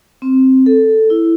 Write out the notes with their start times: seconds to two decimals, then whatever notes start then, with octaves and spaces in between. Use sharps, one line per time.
0.22 C4
0.66 A4
1.10 E4